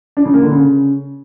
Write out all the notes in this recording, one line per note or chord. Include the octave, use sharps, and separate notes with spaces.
D4
C#3
A#3
D3
C#3